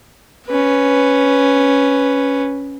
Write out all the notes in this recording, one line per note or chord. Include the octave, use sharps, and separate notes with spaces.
C#4 B4